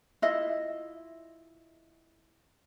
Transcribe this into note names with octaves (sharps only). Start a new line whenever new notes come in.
E4 F4 D#5 E5